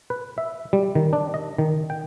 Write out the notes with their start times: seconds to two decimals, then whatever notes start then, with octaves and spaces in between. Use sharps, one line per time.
0.10 B4
0.38 E5
0.73 G3
0.95 D#3
1.13 D4
1.34 D#5
1.58 D#3
1.90 G5